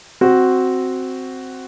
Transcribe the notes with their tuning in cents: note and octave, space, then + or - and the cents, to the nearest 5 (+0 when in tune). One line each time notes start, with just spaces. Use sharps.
C4 +0 F#4 +0